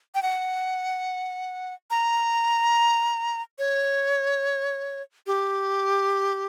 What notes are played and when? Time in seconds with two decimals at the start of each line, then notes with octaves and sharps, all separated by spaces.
0.15 G5
0.23 F#5
1.91 A#5
3.59 C#5
5.27 G4